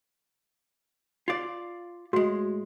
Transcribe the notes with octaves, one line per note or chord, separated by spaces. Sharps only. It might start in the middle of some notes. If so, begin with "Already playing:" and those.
F4 D5
A2 G#3 F#4